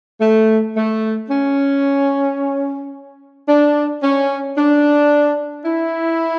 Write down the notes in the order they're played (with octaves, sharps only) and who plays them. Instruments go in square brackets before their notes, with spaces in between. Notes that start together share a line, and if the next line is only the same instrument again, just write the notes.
[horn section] A3
A3
C#4
D4
C#4
D4
E4